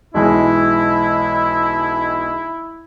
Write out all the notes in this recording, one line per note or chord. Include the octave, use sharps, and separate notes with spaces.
B1 E3 G#3 E4